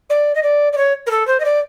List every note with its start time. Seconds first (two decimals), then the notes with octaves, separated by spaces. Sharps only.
0.09 D5
0.35 D#5
0.43 D5
0.72 D5
0.77 C#5
1.06 A#4
1.10 A4
1.27 C5
1.40 D#5
1.44 D5